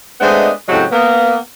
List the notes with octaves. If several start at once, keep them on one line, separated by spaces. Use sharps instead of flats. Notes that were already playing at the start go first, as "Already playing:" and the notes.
G#3 A3 B3 C4 D4 D#5
A2 C#3 F#3 G#3 C4 G4
A#3 B3